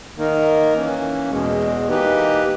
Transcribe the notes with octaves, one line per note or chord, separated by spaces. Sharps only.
D#3 A#3 D#4 A#4
E3 A#3 C#4
E2 B2 G#3
E3 A#3 D#4 G4 B4